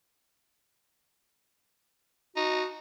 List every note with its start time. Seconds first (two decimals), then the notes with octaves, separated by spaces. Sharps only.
2.37 D#4 F#4